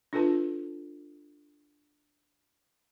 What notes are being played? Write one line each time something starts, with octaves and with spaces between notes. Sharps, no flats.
D4 F4 A4 B4 A5